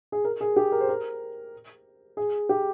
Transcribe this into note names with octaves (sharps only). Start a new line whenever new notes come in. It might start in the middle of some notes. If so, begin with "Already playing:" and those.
G#4
A#4
G#4
G4
A#4
C5
A#4
G#4
G4